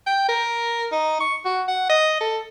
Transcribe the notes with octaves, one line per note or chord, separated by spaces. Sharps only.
G5
A#4
D#4
C#6
F#4
F#5
D#5
A4